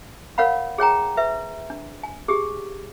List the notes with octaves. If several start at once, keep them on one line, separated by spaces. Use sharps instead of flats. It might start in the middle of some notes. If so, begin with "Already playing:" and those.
A#4 C#5 F5 F#5 B5
G#4 C#5 G5 A#5
B4 E5
D4
G#5
G4 G#4